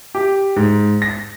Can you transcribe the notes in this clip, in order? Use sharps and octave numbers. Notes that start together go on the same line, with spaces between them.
G4
G#2
A#6